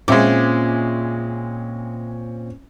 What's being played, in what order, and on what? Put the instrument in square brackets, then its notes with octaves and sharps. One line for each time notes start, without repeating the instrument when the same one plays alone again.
[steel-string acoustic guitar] A#2 [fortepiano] G#3 E5 D6 [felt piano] C4 C#4